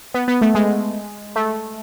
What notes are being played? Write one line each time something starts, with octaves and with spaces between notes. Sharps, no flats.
B3
B3
A3
G#3
A3